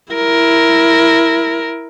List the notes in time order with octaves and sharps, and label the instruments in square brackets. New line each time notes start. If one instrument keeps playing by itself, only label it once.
[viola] E4 A#4